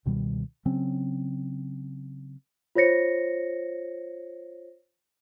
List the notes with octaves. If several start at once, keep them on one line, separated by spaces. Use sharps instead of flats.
C#2 B2 D#3 G3
C#3 F#3 C4 C#4
F4 C5 C#5 A#6 C#7